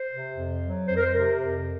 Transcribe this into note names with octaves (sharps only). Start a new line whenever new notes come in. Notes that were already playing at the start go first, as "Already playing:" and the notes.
Already playing: C5
C3
F2
F#3
F2 C5
A#4
C5
C3 A#4
F2